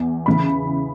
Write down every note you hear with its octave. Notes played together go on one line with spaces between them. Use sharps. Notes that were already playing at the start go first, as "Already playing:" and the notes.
Already playing: E2
C#3 E3 B5